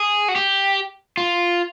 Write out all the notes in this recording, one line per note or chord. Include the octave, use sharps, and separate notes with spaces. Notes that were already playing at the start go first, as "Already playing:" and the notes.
Already playing: G#4
F#4
G4
F4